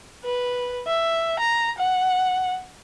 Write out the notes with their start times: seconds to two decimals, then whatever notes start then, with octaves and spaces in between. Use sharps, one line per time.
0.25 B4
0.87 E5
1.40 A#5
1.78 F#5